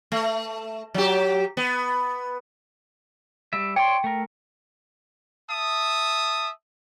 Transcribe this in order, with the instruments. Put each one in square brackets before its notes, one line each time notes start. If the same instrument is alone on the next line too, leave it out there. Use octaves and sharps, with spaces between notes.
[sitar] A3
F#3 G4
B3
[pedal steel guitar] G3 E5
[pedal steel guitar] C#5 D5 C6 [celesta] G5
[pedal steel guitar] A3 A#4
[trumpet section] E5 A5 D#6